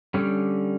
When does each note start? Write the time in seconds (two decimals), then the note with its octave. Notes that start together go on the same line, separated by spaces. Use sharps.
0.14 D3 G3 C#4